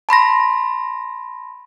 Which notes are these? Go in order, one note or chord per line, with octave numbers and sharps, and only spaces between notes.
A5 B5 C6 A#6